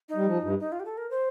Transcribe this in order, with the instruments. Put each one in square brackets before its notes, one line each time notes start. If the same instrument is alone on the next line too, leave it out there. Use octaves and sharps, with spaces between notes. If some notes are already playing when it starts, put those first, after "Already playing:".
[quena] D#4
[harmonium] G3
F3
G2
[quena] D#4
F4
G4
A4
A#4
C5